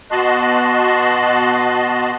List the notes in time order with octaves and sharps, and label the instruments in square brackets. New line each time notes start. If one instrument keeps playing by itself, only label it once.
[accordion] B2 F#4 D#5 A5 C6 F#6